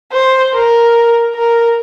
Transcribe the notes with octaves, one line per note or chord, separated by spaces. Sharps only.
C5
A#4
A#4